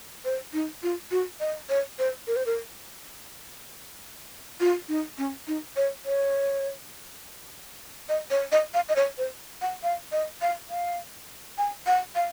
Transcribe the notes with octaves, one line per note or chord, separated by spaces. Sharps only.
C5
D#4
F4
F#4
D#5
C#5
C5
A#4
C5
A#4
F4
D#4
C#4
D#4
C#5
C#5
D#5
C#5
D#5
F5
D#5
C#5
C5
F#5
F5
D#5
F5
F5
G#5
F#5
F5